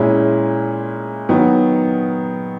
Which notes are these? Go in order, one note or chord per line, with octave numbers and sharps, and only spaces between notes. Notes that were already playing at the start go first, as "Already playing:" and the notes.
Already playing: A#2 G#3 C#4 E4
D#3 F#3 B3